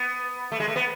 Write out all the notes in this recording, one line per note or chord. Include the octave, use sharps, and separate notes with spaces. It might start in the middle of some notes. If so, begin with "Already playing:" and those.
Already playing: B3
A3
G#3
A3
B3